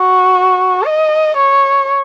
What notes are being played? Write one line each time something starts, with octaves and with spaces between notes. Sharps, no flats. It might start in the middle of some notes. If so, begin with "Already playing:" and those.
Already playing: F#4
D#5
C#5